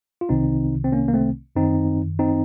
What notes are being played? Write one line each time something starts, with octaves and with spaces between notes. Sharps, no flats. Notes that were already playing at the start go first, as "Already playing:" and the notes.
F4
C2 C3 D#3 C4 D#4
C4
A#3 C#4
A#3
A3 C4
F#2 D#3 C4 D#4
C4 D#4